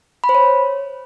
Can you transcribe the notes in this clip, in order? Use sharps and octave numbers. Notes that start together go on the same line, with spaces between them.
B5
C5
C#5